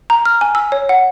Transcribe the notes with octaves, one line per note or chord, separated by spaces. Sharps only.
A#5
F6
G#5
E6
C#5
F#5